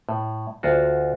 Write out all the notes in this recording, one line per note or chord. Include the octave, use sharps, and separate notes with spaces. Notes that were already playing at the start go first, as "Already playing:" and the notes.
A2
D2 F4 F#4